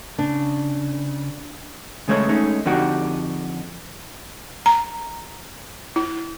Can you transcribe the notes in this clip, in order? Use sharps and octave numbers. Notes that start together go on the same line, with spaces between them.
C#3 D4
C#3 G#3 A3 C#5
G#3 A3 C#4 D#4
F2 D3 D#4 F#4 G4
A#5
E4